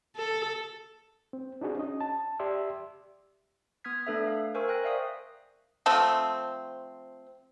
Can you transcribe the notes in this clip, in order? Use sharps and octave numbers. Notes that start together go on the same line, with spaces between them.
A4
C4
D4 D#4 F#4 G#4
C#4 D#5
A5
G4 D5 E5 C6 E6
B3 D#6 F6 G#6 B6
A3 D4 A4 B4 E5
F5
A#4 C5 G#5 C#6 E6
A#4 G5 F#6 A#6
D5 E5 F5 D#6
F3 A3 C4